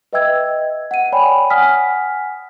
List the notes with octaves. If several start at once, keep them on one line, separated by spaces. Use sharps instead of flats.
B4 D#5 E5 G5 E6 G#6
F#5 D#7
C#5 D5 G5 G#5 B5
F#5 G#5 D#6 F6 B6